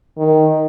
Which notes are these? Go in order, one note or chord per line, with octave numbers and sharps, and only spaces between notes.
D#3